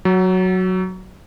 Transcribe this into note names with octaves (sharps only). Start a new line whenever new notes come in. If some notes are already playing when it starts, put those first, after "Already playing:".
F#3